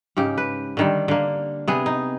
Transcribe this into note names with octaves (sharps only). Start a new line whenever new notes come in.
G#2 C#3 G4
B4
D3 D#3 G3
D3 A#3
C3 B3 G#4
D#4